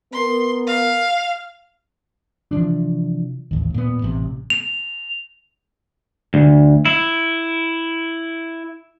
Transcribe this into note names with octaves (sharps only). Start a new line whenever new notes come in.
B3 A#4 C6
F5
C3 E3 F3 D4
A1 D#2
A#2 B3
A1 C3
F7
D2
E4